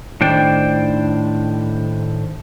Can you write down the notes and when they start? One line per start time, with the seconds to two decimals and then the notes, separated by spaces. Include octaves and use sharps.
0.21 A2 D#3 D4 C5 G5